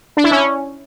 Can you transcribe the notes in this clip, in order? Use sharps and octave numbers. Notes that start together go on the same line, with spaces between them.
D4
E4
C#4